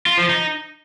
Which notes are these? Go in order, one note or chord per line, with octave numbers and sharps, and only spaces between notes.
F4
F3
D#4